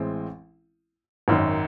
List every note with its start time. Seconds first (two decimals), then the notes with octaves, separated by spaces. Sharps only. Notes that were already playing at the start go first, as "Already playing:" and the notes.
Already playing: A1 E3 G#3 C4
1.28 G#1 F#2 D#3